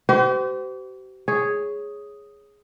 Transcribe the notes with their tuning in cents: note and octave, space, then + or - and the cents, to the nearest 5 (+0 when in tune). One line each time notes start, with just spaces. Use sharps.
G4 -40 C5 -35
G#4 +0 C#5 +0